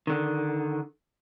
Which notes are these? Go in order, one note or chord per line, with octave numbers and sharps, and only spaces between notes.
D3 D#3